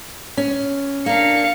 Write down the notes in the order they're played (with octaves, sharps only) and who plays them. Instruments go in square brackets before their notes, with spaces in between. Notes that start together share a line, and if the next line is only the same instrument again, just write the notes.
[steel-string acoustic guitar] C#4
[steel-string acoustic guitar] A#3 D4 [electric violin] F5 C#7